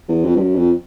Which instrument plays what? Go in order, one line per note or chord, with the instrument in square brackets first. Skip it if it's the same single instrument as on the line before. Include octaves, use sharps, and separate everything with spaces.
[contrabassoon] E2
F2
G2
F#2
F2